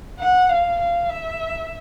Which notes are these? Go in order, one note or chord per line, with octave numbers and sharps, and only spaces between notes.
F#5
F5
F5
E5